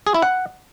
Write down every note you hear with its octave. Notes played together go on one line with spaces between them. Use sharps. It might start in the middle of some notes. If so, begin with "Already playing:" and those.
G#4
E4
F#5